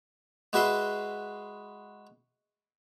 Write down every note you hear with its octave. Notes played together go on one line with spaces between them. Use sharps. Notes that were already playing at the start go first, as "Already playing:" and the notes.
G#3 F#4 B4 E5 C6